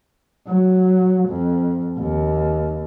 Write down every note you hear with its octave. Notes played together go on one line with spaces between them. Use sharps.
F#3
F2
D#2